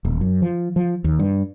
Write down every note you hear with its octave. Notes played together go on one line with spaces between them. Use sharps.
D#1
F#2
F3
F3
D#2
G2